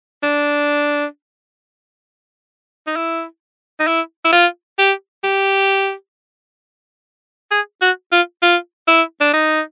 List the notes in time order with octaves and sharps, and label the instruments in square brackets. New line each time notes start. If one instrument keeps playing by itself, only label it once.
[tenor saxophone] D4
D#4
E4
D#4
E4
E4
F4
G4
G4
G#4
F#4
F4
F4
E4
D4
D#4